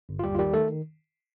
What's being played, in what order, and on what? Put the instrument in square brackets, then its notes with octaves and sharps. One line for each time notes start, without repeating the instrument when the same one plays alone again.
[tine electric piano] G1
F4
D#2 G3 G4
F4
D#3 G3 G4
D#3 A3 A4